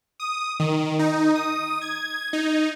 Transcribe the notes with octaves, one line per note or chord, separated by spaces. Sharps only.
D#6
D#3
D#4
D#6
G#6
D#4